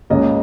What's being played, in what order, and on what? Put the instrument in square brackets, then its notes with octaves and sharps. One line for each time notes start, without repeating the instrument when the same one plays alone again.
[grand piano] C#2 C#3 A#3 D#5